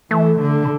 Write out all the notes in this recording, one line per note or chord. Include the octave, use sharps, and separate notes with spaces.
E3 A3
D3